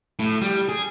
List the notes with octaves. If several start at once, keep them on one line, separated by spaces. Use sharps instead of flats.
A2
G3
G#4